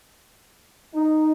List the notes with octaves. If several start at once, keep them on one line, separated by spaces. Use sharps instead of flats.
D#4